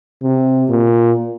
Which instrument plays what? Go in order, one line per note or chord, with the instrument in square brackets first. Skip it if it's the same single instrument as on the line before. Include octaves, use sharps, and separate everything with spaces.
[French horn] C3
A#2